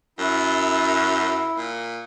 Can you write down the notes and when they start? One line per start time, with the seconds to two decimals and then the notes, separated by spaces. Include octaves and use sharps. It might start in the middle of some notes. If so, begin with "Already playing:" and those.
0.19 F#2 E4
1.57 A#2